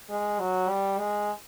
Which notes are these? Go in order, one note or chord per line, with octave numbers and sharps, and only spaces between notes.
G#3
F#3
G3
G#3